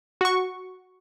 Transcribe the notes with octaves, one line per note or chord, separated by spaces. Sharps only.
F#4 C#6